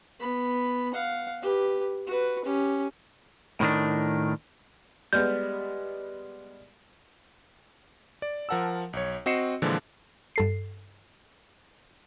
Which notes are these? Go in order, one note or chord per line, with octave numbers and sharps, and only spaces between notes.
B3 B5
F5 F#5
G4 B4
F#4 B4
C#4 G4
A2 D#3 D4
G3 G#3 B3 D5 F6 G6
D5
F3 A#4 F#5 A5 E6
B1 C#5
C4 F#4 D#5 C7 C#7 E7
A#2 D3 E3 F3 G#3
G2 A4 C7